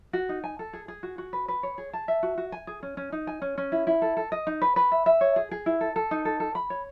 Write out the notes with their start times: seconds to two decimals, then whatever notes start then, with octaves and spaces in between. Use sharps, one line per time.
0.13 F#4
0.29 D#4
0.44 G#5
0.59 A4
0.73 G#4
0.88 G#4
1.03 F#4
1.18 F#4
1.33 B4
1.48 B4
1.63 C#5
1.78 G#4
1.93 A5
2.08 E5
2.23 F#4
2.38 F#4
2.52 G#5
2.67 G#4
2.83 C#4
2.97 C#4
3.12 D#4
3.27 G#5
3.42 C#4
3.58 C#4
3.72 E4
3.87 E4
4.02 A4
4.17 A4
4.32 D#5
4.47 D#4
4.62 B4
4.76 B4
4.92 E5
5.06 E5
5.21 C#5
5.36 G#4
5.51 G#4
5.66 E4
5.81 A4
5.96 A4
6.11 D#4
6.25 A4
6.40 A4
6.55 B5
6.70 C#5